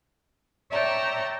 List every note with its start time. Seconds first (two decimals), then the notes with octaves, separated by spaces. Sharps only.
0.71 C#5 D5 E5 G5 A5 A#5